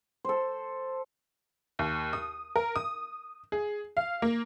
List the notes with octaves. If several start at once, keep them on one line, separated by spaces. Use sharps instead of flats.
A4 C5
D#2
D#6
A#4
D#6
G#4
F5
A#3